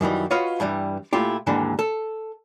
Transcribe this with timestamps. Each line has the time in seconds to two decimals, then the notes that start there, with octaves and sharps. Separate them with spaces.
0.01 F#2 D#3 E3 G3
0.31 F4 F#4 B4 C#5 D#5 F5
0.60 G2 E3 G3
1.13 A#2 A3 E4 F4 G4
1.47 D#2 G#2 D3 E3
1.79 A4